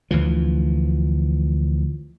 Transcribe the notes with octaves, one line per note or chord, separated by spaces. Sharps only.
D2 E3 F3